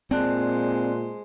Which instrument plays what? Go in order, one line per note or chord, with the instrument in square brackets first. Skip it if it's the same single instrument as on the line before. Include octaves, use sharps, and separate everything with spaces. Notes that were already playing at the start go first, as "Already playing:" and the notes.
[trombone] A#2 [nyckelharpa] G#3 C5 [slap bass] C4 [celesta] D5 A5 F#6